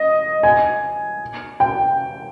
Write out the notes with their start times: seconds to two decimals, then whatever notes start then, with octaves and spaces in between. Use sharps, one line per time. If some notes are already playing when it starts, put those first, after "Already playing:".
Already playing: D#5
0.43 G#5
1.60 G5